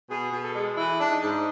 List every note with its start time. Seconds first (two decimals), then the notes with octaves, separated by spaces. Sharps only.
0.09 B2 G#4
0.32 B2
0.43 A4
0.54 G#3
0.77 E3 E4
1.00 D4
1.11 D#4
1.23 G#2